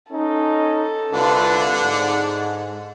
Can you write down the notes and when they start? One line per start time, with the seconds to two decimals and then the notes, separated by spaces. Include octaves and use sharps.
0.12 C#4 D#4 A4
1.12 C2 D3 D4 F4 B4 F#5
1.83 G#2